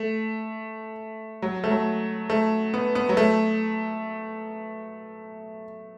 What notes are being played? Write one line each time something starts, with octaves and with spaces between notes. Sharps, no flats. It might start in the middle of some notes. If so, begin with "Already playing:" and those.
Already playing: A3
F#3
A3
F#3
A3
B3
B3
F#3
A3